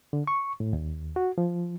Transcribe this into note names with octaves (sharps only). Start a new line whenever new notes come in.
D3
C#6
A2
D#2
F#4
F3